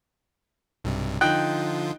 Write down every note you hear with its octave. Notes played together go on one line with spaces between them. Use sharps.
B1 G2 C3
D3 F3 D#4 F4 G5 F#6